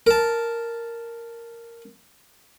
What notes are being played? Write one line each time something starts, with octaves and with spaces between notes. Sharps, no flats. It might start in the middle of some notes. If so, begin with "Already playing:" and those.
A#4 A5